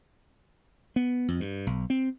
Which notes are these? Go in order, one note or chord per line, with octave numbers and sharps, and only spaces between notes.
B3
F2
G2
B1
C4